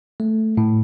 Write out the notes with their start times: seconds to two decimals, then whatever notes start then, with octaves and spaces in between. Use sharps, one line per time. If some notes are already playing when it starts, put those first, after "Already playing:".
0.20 A3
0.57 A2